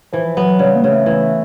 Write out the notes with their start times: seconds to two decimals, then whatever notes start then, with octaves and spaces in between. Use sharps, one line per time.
0.13 E3 F3
0.37 F#3 B3
0.59 C#3 G3
0.75 A#3
0.83 C#3 A3
1.06 E3